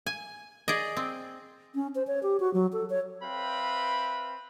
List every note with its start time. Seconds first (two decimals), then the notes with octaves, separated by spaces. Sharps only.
0.06 G#5
0.68 G#4 D5 D#5
0.97 C4
1.75 C#4
1.95 C5
2.07 C#5
2.23 G4
2.40 F#4
2.54 F#3
2.73 A4
2.90 C#5
3.23 C4 B4 E5 F5 G5 B5